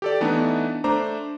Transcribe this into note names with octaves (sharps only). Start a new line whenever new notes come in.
G4 A4 D5
E3 A3 B3 D4 D#4
A3 D4 C5 A#5 D6